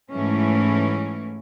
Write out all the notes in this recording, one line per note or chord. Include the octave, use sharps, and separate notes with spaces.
G#2 E3 A3 C#4